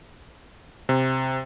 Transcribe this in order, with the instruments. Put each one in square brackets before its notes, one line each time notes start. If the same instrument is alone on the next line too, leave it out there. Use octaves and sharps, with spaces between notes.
[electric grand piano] C3